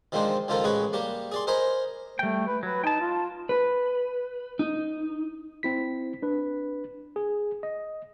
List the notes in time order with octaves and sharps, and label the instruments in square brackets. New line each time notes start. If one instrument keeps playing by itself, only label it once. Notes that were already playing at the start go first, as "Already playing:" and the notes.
[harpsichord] D#3 F3 G#3 C4 D4 D#4
C#2 D#3 F3 F4 A4 A#4
A1 G#3 G#4 B4 C#5 B5
G3 A#3 G4
G#4 D5 C6
A#4 C5 D#5 G#5 A#5 B5
[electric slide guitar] G3 G5 [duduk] A3
[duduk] B4
[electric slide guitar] F#3 [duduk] B4
[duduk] D#4 [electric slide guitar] G5 A5
[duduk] F4
[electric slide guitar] B4
D#4
[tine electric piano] C4 E4 B6
D4 B4
G#4
D#5